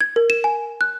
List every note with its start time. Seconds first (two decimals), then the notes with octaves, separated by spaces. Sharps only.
0.01 G#6
0.16 A#4
0.30 E7
0.44 G#5
0.81 F#6